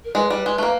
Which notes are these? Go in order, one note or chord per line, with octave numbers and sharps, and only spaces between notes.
A#4
G#3 B4
G3
G#3
A3
A#3